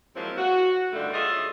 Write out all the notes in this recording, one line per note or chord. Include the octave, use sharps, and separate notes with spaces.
F3 F#3 G#3 A#3 C4 E4
F#4
G2 D3 D#3 G3 A3 F4
F4 G#4 A4 C#5 D#5 E5